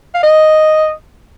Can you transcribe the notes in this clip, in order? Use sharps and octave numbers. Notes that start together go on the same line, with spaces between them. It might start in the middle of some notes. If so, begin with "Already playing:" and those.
F5
D#5